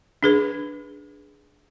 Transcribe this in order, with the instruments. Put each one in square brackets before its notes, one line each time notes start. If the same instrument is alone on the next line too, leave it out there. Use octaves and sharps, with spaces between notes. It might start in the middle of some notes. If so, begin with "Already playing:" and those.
[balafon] D4 G#4 B4